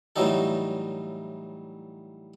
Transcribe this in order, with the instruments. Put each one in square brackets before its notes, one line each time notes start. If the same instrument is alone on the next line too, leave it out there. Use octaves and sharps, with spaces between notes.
[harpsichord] A2 E3 F#3 G3 D#4 A4